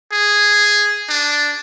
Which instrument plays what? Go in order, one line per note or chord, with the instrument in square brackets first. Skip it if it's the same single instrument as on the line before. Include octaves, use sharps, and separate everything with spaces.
[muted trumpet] G#4
D4